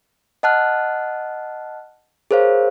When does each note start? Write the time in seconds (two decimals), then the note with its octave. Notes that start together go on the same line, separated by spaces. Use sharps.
0.43 D#5 F#5 A5 F6 F#6
2.31 G#4 A#4 C5 C#5 F5